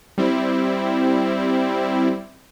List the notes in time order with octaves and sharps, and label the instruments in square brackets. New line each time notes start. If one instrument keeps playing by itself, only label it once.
[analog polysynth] G3 C4 E4